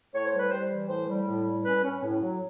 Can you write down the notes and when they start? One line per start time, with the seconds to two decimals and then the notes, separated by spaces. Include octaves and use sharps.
0.13 A2 C#5
0.26 C5
0.33 G3
0.38 B4
0.51 G3 C5
0.70 E3
0.89 A2 C5
1.08 G3
1.27 A2
1.46 G3
1.64 C#4 B4
1.83 C#4
2.03 A2
2.21 F#3